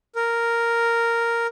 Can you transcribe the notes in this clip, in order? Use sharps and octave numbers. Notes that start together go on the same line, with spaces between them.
A#4